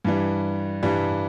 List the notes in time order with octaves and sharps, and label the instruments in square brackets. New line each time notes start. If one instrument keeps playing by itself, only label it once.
[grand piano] G2 E3 G3
G2 E3 G3